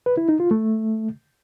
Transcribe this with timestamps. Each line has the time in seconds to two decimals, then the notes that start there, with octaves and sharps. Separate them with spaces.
0.06 B4
0.17 E4
0.29 D#4
0.40 F4
0.51 A3